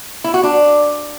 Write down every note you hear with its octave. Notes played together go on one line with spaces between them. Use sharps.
E4
F#4
D4